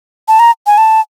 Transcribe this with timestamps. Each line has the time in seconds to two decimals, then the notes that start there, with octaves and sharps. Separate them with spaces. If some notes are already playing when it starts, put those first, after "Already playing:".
0.28 A5
0.39 A#5
0.67 G#5
0.78 A5